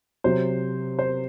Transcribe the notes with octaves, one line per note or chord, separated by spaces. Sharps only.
C3 F#3 C5
C5